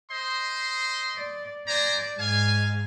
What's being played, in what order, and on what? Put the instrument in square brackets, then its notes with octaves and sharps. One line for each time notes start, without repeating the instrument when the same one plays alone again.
[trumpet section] C5 D#5 C6
[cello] D5
[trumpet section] C5 G#5 A#5 [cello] D5
[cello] G#2 [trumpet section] F5 G#5